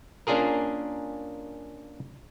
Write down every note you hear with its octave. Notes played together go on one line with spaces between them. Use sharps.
A#3 C#4 D4 F4 G#4 A#4